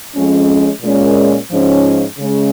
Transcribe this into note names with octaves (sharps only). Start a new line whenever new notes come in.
F2 F3 G#3 C#4
A#2 G#3 C#4
G#2 F3 C#4
C#3 G#3 C#4